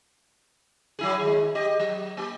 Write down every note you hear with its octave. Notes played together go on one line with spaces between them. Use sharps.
F#3 E4 G#4
D#3 G#3
G4 D#5
F#3
A#3 G4